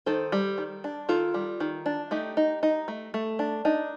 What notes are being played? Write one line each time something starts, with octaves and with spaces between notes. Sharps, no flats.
D#3 A4 C5
G3
D#3
D4
D#3 F4 A4
G3
D#3
D4
A3 D#4 G4
D#4
D#4
A3
A3
D4
D4 D#4